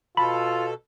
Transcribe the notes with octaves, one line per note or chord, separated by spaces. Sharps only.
B2 F4 A4 B5